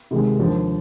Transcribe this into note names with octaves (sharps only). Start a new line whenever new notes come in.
C3 D#3 G#3
D#2 D3 F3